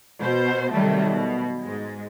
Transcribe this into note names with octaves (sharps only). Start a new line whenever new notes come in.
B2 C5
C3 D#3 F#3 G3 A3
B2
G#2 G#3